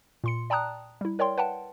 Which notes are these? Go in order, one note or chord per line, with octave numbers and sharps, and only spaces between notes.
A#2 C6 C#7
D5 G5 A5 A#5 D#6 F#6
G3 E4
A#4 C#5 D5 G5 C6
B4 F#5 G5 A5